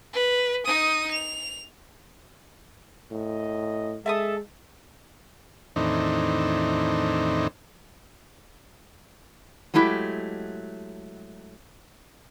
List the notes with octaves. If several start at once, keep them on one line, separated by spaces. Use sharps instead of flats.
B4
D#4 D#6
F7
A2 D#5
G#3 A4 E5 A5 D#6
E2 A2 D#3 C4 D4 D#4
F#3 G#3 A3 E4 G4